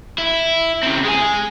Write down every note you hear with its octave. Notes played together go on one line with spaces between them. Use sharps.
E4
C#3 C4
G#3 G#5